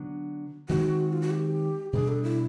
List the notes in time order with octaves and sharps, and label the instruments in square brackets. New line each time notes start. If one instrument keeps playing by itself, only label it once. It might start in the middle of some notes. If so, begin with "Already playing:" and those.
Already playing: [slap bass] D3 F#3 B3 D4
[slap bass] D#3 G#3 C4 [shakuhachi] F#4
[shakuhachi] F4
F#4
G4
[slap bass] B2 G3 B3 D4 [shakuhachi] G#4
[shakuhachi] A4
E4